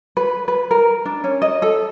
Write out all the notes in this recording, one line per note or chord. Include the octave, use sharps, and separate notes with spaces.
B4
B4
A#4
D4
C#4
D#5
A4